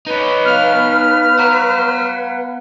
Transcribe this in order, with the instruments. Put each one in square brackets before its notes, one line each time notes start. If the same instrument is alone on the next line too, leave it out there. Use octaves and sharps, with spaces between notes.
[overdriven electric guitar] D#4 C#5 [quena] B4
[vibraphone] B3 F5 [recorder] F6
[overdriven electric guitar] F#5 A#5